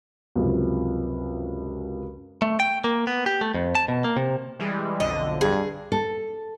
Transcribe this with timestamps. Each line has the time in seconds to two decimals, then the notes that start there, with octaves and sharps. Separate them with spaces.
0.36 C#2 F#2 C3 F3
2.42 A3
2.60 G5
2.84 A#3
3.07 B3
3.26 G4
3.41 A3
3.54 F2
3.75 A5
3.88 B2
4.04 A#3
4.16 C3
4.59 E3 G3 G#3
5.00 B1 F2 D3 D#5
5.41 G2 G#4
5.92 A4